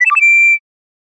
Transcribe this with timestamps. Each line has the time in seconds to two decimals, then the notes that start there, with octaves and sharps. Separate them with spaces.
0.01 B6
0.06 E7
0.11 D6
0.16 E7
0.21 D7